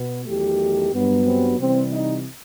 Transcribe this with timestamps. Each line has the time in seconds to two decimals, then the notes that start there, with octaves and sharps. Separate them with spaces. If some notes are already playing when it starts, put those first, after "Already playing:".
Already playing: B2 B3
0.26 E2 D#3 F#3 A3 G4
0.92 G2 F#3 B3
1.26 C4
1.59 C3 E3 G3 C4
1.92 D#4